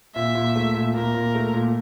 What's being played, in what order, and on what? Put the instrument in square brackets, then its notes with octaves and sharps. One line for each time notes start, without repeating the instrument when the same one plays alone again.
[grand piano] A#2 [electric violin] E5
[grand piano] A#2
A3
A#2
[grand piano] A#2 [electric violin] A#4
[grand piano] A#2
A3
A#2